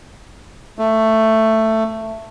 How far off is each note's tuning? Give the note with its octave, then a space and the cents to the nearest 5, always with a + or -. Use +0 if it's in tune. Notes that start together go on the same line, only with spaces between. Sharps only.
A3 +10